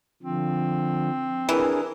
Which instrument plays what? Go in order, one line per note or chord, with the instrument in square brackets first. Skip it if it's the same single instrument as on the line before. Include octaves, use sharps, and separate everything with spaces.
[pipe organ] D3 F3 [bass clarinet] C4
[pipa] E3 [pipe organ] D4 G#4 A#4